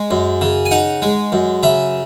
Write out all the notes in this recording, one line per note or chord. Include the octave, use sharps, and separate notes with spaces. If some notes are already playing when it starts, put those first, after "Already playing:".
Already playing: G#3
F#2
C#3
G#5
D#4 F#5
G#3
F#2
C#3 E5